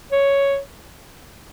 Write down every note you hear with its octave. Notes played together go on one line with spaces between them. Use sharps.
C#5